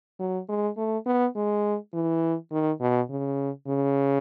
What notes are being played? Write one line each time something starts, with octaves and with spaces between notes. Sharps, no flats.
F#3
G#3
A3
B3
G#3
E3
D#3
B2
C#3
C#3